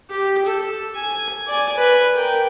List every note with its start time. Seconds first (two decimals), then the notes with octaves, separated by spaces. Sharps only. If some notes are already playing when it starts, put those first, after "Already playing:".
0.10 G4
0.45 A4
0.95 G#5
1.48 D5 G#5
1.77 B4
2.15 A#4 G5